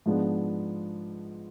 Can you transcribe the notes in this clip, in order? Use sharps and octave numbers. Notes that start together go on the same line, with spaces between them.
G#2 F3 G#3 B3 D4